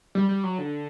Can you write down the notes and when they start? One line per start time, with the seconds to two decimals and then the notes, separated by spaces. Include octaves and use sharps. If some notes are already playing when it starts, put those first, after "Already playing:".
0.15 G3
0.29 G3
0.44 F#3
0.58 D3